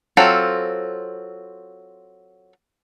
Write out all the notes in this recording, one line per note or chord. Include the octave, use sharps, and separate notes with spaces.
F#3 C4 F4 A4